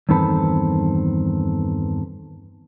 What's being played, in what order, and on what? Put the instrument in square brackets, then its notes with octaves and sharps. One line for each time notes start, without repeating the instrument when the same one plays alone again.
[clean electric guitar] E2 G2 D#3 C4 A4 B5